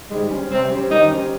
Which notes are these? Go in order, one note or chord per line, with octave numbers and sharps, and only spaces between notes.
G#2 G3 G#3
C#4 G4 C5
C3 G3 C4
C#4 G4 C5
D#3 G3 D#4
C#4 G4 C5